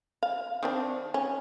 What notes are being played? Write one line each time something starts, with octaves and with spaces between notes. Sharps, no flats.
F5
D#3 C4 D4
C#4